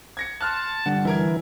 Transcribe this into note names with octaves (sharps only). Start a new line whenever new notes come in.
G#6 A#6 C#7
A5 C6 F6 F#6
D3 G3 D4 F#5
E3 E4 A#4 G#6